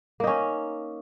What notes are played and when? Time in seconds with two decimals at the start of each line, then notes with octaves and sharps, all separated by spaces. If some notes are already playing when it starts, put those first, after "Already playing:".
0.20 A#3
0.24 D#4
0.27 C#4